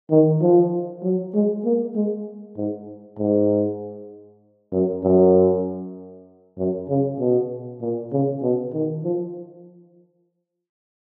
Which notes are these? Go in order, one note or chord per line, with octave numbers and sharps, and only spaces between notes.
D#3
F3
F#3
G#3
A#3
G#3
G#2
G#2
F#2
F#2
F#2
C#3
B2
A#2
C#3
B2
D#3
F3